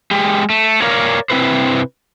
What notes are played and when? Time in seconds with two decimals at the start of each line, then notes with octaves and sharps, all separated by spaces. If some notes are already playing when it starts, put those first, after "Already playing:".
0.11 G#3 G4
0.50 A3
0.82 A#4 C#5 D5 F5
1.30 C3 C4 E4 B4 C5